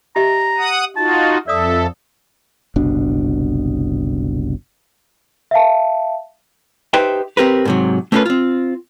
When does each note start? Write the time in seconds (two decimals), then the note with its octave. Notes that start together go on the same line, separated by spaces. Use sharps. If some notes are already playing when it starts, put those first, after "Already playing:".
0.16 G4 D#5 E5 A#5
0.58 F#5 D#6
0.96 D#4 F4 F#4 A5
1.48 F2 A4 D5 E5 D#6
2.76 F#1 C2 B2 D4
5.51 E5 F5 A5
6.93 D#4 G4 B4 C5 E5 G5
7.37 C4 G4 A#4 B4
7.65 G#2 C3 F#3
8.12 A3 A#3 C#4 F4 A4 B4
8.26 C4 F4